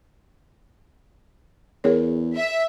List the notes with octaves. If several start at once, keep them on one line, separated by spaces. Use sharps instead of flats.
E2 G#4 A#4 C#5
E5